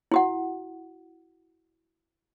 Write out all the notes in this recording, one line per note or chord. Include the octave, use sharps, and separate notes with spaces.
E4 F#4 F#5